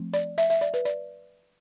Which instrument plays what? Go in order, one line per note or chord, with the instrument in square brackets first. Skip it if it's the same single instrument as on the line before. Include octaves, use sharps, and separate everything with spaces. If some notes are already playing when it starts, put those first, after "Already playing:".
Already playing: [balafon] F3 A3 C4
D5
E5
E5
D5
B4
D5